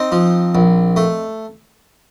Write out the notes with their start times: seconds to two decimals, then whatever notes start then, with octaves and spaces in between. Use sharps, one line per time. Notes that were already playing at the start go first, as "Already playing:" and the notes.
Already playing: C4 D#4
0.12 F3
0.55 A#1
0.96 A3